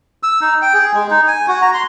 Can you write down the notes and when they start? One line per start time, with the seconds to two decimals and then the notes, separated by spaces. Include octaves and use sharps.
0.23 E6
0.41 D#4
0.62 G5
0.74 G#4
0.94 G#3
1.11 D#4
1.27 G#5
1.48 F#4
1.62 A#5
1.74 C6